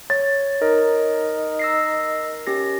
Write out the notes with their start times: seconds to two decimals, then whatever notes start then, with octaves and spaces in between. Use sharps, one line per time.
0.10 C#5 A6
0.62 D#4 A#4
1.59 E6 A#6 C7
2.47 C#4 G4 A#6